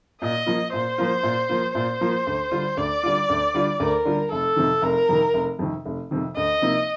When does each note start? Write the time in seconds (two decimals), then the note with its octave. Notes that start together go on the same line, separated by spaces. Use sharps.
0.22 A#2 D#5
0.46 F3 A#3 F4
0.73 A#2 C5
0.98 F3 A#3 F4
1.23 A#2
1.49 F3 A#3 F4
1.74 A#2 C5
2.01 F3 A#3 F4
2.27 D2
2.51 D3 G3 D4 F4
2.77 D2 D5
3.03 D3 G3 D4 F4
3.29 D2
3.54 D3 G3 D4 F4
3.80 D2 A#4
4.05 D3 G3 D4 F4
4.31 F1 A4
4.56 F2 C3 D#3
4.82 F1 A#4
5.09 F2 C3 D#3
5.34 F1
5.59 F2 C3 D#3
5.85 F1
6.11 F2 C3 D#3
6.36 D2 D#5
6.62 C3 F3 A#3 D#4